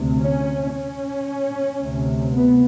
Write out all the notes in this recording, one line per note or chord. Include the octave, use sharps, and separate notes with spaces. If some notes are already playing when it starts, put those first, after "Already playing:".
Already playing: D2 C3
C#4
C#4
D2 C3
B3